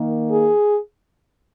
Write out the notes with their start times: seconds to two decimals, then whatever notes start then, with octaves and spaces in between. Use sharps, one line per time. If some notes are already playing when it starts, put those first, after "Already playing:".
Already playing: D#3 A#3
0.30 G#4